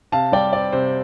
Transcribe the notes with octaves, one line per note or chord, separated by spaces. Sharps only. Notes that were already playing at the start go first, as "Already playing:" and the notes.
C3 F5 A5
G3 D5 G5
C4 D5
C3 C5